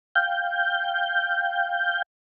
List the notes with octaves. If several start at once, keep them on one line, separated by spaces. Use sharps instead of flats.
F5 G5 G6